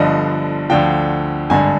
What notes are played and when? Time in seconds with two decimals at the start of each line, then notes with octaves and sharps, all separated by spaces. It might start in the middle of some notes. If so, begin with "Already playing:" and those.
Already playing: G1 G2 D3 F3 D#5
0.70 D2 D3 F3 G5
1.50 G#1 G2 D3 G#5